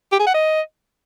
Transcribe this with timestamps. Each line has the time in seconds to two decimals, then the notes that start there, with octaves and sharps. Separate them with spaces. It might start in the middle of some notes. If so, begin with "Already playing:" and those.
0.12 G4
0.20 G#4
0.27 F#5
0.34 D#5